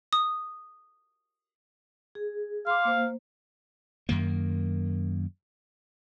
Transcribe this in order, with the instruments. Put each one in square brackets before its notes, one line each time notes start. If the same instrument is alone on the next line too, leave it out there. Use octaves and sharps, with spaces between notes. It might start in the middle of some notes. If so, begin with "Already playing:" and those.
[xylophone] D#6
[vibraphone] G#4
[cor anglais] F5 [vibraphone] C6 D6
[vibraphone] A#3 C5
[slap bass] F#2 D#3 A#3